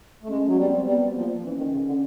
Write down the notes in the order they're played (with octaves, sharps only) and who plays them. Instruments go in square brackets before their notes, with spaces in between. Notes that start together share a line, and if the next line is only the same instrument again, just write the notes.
[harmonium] A3
[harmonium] G#3 [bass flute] C#4
[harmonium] F#3 [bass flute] C#4
[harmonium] G3 [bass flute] B3
[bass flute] C4
[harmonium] G3 [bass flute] B3
[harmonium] F3 [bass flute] A#3
[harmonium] E3 [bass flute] C#4
[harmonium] D#3
C#3
D3